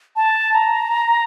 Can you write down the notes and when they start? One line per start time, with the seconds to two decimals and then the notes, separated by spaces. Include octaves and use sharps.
0.16 A5
0.54 A#5